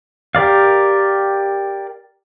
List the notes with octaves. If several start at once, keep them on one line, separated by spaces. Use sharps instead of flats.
G4 A#4 D5 F5